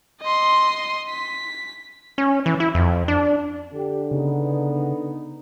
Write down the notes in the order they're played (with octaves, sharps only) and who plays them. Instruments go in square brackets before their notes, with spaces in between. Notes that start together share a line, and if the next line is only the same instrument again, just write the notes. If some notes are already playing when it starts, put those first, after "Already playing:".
[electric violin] D#5 C6
B6
[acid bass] C#4
E3
E4
F2
D4
[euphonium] D3 [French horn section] G4
[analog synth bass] C#3 [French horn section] B3 D#4